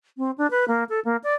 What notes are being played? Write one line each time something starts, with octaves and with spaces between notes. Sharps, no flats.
C4
D4
B4
A#3
A4
A#3
D5